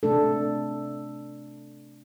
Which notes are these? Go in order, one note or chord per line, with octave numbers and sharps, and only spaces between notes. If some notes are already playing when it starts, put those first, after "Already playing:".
C3 A3 D4 A4